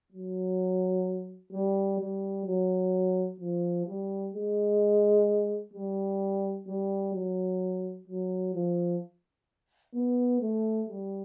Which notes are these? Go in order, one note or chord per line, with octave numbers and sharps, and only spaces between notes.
F#3
G3
G3
F#3
F3
G3
G#3
G3
G3
F#3
F#3
F3
B3
A3
G3